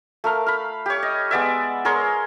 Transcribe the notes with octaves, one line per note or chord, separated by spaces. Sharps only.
A3 A#4 F5
F5 B5
G4 C#5
D#5
G#3 B3 D5 E5
G#4 A#4 C#5 C6